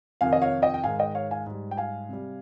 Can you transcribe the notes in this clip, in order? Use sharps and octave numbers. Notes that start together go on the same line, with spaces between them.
F2 C3 D#3 F5 G#5
D#5
C#5 F5
D#5 G5
G5
G#2 D#3 G#3 F5 G#5
D#5 G5
C#5 F5
F5 G#5
G#2 G3
G5
F5 G#5
C3 G3